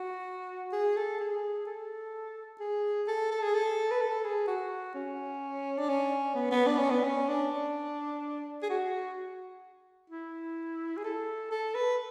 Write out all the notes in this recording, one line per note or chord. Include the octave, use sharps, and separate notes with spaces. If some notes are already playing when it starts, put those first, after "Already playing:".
Already playing: F#4
G#4
A4
G#4
A4
G#4
A4
A4
G#4
A4
B4
A4
G#4
F#4
C#4
D4
C#4
B3
B3
D4
C#4
B3
C#4
D4
G#4
F#4
E4
G#4
A4
A4
B4